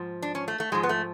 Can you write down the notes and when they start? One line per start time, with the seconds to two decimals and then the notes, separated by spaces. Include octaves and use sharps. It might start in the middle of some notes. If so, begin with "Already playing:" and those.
Already playing: G#2 F3
0.22 D4
0.35 C#4
0.48 A3
0.60 A3
0.72 G#2 F3 G#3
0.83 B3
0.89 A3